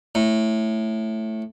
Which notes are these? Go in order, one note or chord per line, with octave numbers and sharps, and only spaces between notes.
A2